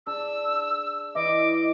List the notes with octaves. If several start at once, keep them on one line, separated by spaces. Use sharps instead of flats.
D4 G#4 E6
E3 D#5 D6